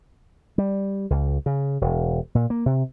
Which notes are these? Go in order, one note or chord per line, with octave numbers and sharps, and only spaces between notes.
G3
C#2
C#3
E1
A#2
A#3
C3